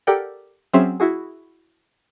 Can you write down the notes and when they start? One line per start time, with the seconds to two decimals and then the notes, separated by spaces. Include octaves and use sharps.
0.07 G4 A4 A#4 D5 F#5 G5
0.73 F#3 C4 C#4 G#4 C5 E5
1.00 E4 F#4 G#4